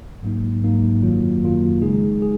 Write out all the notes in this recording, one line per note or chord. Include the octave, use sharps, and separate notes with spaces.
G#2 F#3 A#3 D#4
G#2 F#3 A#3 D#4
F#2 D#3 F#3 A#3 F4
F#2 D#3 F#3 A#3 F4
C#3 G#3 D#4 G#4
G#4